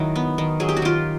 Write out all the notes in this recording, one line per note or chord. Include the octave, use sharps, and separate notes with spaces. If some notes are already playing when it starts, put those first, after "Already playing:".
Already playing: D#3 F#3 E4 F#4
B3
D#3
F#3 G#4
G4
F#4
D#3 F4 G4